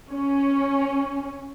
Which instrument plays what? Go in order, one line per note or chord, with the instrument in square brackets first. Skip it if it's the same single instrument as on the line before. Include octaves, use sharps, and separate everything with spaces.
[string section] C#4